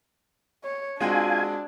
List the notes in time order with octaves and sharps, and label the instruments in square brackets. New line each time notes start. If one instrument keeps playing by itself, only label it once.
[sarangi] C#5
[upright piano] G#3 C4 F#4 [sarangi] D4 [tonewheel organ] F4 G#5